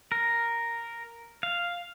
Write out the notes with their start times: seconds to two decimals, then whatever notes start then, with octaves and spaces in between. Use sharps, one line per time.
0.12 A#4
1.43 F5